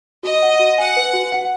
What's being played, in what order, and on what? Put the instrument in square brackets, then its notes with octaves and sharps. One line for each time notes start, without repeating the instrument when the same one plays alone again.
[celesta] F#4 [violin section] D#5
[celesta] F#5
F#4
[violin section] F#5 [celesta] G#5
[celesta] B4
F#4
F#5